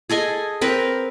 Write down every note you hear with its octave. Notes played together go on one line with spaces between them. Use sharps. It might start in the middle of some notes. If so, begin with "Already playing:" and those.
G#4 A4 D#5 G#5
C4 A#4 B4